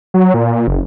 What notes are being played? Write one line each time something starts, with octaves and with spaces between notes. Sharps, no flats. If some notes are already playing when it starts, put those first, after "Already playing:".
F#3
A#2
F#1